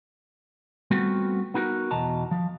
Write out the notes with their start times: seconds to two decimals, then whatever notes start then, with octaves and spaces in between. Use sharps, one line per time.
0.91 G3 A3 B3 C4 F4 F#4
1.54 B3 D#4 F#4 G#4 A#4
1.91 E2 B2 D#5 A5 A#5
2.31 F3